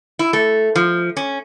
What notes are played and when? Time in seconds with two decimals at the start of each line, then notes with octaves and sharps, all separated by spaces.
0.19 E4
0.33 A3
0.76 F3
1.17 C#4